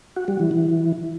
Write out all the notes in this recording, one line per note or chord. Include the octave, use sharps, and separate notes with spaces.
F#4
G3
E3
E3